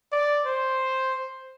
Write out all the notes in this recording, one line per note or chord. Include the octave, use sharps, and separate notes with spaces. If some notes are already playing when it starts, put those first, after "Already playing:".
D5
C5